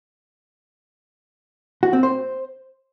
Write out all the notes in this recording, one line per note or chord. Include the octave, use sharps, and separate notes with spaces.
F#4
C4
C5